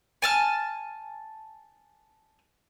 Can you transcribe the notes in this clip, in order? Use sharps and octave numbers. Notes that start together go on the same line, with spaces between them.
G#5 A5 F6